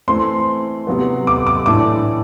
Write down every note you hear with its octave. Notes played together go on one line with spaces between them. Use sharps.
E3 A3 C4 C6
C3 F#3 B3
D6
D6
A2 E3 A3 D4 D6